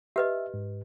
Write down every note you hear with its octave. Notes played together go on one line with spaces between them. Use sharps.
G4 B4 D#5 E5
G#2